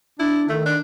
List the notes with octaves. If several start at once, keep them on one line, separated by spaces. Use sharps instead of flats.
D4 E4
D#3 A3
D4